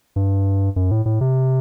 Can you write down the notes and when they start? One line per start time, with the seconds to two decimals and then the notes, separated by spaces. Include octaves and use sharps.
0.16 G2
0.76 F#2
0.91 A2
1.05 A2
1.21 C3